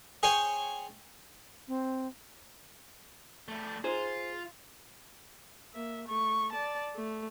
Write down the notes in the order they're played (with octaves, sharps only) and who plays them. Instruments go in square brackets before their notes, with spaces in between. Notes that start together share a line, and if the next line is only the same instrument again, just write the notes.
[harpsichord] G#4 C5 C#5 G5 G#5
[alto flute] C4
[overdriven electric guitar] G3 A3
[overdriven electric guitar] F4 [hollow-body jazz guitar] G#4 C5
[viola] A#3 E5
A3 C#6
D5 A5
A3